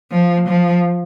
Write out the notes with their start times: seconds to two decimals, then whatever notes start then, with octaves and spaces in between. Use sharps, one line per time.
0.12 F3
0.48 F3